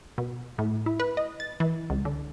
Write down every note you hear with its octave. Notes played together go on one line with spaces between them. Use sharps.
B2
A2
E4
B4
D#5
A6
E3
C#2
D3